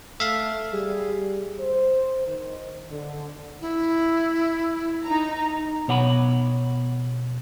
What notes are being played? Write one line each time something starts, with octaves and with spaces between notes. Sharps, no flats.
A3 E5 F5
G3 G#4
C5
D#3
D3
E4
D#4 A#5
B2 C#5 F#5 A#5 B5